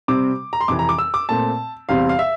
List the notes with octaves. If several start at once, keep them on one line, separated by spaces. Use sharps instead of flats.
C3 G3 C4 D6
A#5
C6
F2 C3 E3 D6
A#5
D6
E6
D6
A#2 A3 C4 A5
E2 C3 G3 C4 F5
F5
E5